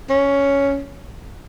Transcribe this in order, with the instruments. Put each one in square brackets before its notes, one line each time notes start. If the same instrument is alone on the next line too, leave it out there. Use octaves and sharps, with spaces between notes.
[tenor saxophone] C#4